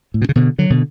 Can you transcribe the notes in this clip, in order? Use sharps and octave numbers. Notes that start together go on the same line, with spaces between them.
A2
B2
C#3
B2 D3
D3 F#3
B2 D3